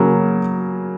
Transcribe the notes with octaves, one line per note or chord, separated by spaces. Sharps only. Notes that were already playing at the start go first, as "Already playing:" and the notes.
Already playing: C#3 F#3 A#3